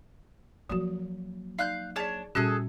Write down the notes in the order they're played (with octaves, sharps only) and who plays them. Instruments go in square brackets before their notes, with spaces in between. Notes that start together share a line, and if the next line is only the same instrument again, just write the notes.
[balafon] F3 F#4 [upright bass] F#3 A#3
[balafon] D#4 D5 [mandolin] F5 F#6 G6
[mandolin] D4 C#5 A5 [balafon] G#4 D5
[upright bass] A#2 [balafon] G3 C#4 F#4 [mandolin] G#4 A4 F#6